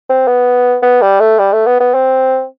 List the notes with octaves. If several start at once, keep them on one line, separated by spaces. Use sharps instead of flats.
C4
B3
B3
G3
A3
G3
A3
B3
B3
C4